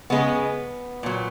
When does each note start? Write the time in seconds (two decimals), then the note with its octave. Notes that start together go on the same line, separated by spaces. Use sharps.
0.10 C#3 G#3 B3
1.03 A#2 F#3